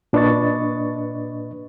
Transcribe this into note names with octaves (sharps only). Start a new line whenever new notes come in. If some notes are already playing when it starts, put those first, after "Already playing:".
A#2 D4 B4 D#5 C#6 A6